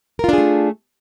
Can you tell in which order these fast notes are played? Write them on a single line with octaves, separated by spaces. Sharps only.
A#4 F4 D4 G#4 A3